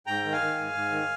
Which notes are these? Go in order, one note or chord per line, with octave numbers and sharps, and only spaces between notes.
G#2 G5 A#5
D#3
F5 G#5
D#3
G#2
G#2
D#3